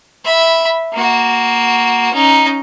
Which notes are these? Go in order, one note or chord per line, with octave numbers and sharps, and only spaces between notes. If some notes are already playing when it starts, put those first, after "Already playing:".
E5 B5
A#3 F#4
C#4 D#4